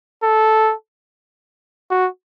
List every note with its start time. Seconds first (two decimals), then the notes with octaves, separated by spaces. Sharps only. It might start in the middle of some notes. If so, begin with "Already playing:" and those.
0.23 A4
1.90 F#4